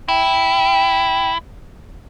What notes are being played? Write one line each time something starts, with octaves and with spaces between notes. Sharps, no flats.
E4 G5